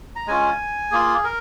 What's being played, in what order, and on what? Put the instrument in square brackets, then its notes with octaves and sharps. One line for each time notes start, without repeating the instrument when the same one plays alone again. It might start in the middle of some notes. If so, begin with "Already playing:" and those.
[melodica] A#5
G#3 C#4 F4 G#5
A#3 F4 G#4
A#4